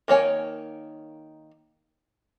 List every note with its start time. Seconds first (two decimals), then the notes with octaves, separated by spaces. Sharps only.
0.08 D#3 A#3 C#5 G#5